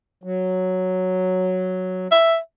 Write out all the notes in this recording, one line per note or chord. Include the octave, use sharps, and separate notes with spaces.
F#3
E5